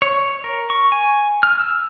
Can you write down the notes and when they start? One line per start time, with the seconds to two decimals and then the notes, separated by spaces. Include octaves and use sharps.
0.02 C#5
0.44 A#4
0.70 C#6
0.92 G#5
1.43 F6
1.59 E6